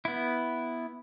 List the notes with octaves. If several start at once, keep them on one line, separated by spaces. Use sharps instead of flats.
B3 E4